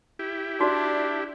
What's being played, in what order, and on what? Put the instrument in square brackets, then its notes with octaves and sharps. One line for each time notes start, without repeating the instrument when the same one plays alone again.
[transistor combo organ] E4 G4
[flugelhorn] D4 [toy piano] F#4 D5